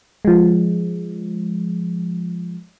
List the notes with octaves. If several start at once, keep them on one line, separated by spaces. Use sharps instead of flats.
F3 G#3